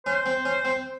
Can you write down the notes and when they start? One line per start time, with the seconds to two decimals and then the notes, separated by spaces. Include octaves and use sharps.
0.06 C#4 C5
0.26 C4
0.45 C#4
0.65 C4